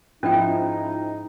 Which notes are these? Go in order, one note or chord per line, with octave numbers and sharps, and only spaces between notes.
G#2 F3 C#4 D#4 E4 G5